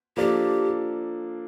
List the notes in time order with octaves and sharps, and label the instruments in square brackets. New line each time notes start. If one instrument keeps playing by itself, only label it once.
[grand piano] F3 A#3 D4 A4 [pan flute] G4